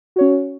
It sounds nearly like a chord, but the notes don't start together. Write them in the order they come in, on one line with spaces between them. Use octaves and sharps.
F#4 C#5 C#4